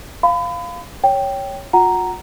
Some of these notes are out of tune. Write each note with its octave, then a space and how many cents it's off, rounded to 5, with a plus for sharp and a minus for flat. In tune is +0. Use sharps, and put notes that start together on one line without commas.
F5 +0 B5 +35
C#5 +5 G5 +0
F4 +45 F#5 +10 A#5 +0